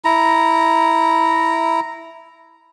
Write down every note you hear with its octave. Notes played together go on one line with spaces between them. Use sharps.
E4 A#5